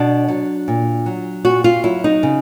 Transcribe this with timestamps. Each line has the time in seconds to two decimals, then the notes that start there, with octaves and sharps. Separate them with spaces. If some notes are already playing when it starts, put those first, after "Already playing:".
Already playing: B2 D4
0.28 F#3
0.68 A#2
1.06 F#3
1.45 A#2 F#4
1.64 F4
1.84 F#3 E4
2.04 D#4
2.23 C#3